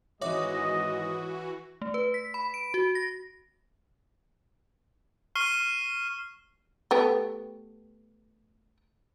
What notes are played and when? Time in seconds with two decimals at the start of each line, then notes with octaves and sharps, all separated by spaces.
0.21 G#1 E3 G#3 F#4 C#5 D#5 E5 D6
1.82 A3
1.94 B4
2.14 B6
2.34 B5
2.54 D7
2.74 F#4
2.95 A#6
5.36 C#6 F6 C7 D#7 G7
6.91 A3 B3 G4